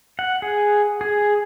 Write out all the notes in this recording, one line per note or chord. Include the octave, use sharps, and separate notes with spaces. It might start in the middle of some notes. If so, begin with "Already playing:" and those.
F#5
G#4
G#4